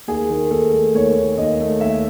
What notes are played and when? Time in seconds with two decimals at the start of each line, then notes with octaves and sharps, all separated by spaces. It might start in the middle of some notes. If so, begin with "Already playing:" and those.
0.07 D#2 G#4
0.30 D#3
0.51 D#2 A4
0.73 A3
0.94 D#2 C#5
1.16 D#3
1.37 D#2 D#5
1.60 A3
1.81 D#2 E5